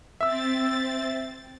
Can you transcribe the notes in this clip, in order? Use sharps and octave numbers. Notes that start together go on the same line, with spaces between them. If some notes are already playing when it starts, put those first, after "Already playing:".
C4 E5 E6 A6